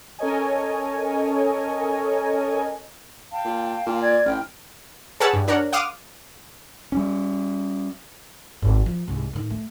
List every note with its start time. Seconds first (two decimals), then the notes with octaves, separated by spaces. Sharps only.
0.19 C#4 A4 A#4 C#5 D#5 G#5
3.31 F5 G5 A5
3.45 A#2
3.86 A#2
4.01 D5 G#6
4.26 A1 G5 F6
5.20 G#4 B4 C#5 F#5 A5 E6
5.33 G2
5.48 D4 A#4 C#5 F#5
5.73 F5 F#5 C6 D6 D#6 F6
6.92 G3 C#4
8.62 G#1
8.86 F3
9.08 C2 G#2
9.33 A2 D#3
9.50 A3